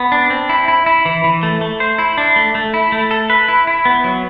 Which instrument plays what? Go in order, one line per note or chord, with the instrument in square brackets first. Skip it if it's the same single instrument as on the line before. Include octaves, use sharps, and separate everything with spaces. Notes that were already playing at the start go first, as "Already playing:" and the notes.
Already playing: [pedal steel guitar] B3
D4
C4
E4
E4
E4
E3
E3
A3
A3
C5
E4
D4
A3
A3
E4
A3
A4
B4
E4
E4
B3
F#3